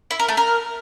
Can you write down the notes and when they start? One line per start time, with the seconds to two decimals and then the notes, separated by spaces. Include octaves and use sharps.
0.11 E4
0.20 A#4
0.28 A3
0.37 A#4